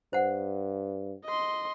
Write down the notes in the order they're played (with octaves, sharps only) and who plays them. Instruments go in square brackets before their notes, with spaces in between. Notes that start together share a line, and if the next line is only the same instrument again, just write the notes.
[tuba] G2 [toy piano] C5 F#5
[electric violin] D#5 C6